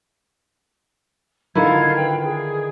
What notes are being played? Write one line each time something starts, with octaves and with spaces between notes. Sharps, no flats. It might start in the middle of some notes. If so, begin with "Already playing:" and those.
D3 D#3 E4 F4 F5 G#6
B4 G5
G#4